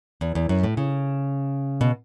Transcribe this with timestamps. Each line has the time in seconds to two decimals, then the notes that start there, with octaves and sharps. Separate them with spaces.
0.21 E2
0.35 E2
0.49 F#2
0.63 A2
0.77 C#3
1.81 B2